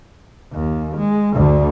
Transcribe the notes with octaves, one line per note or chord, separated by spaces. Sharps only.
D#2
G#3
D2 D3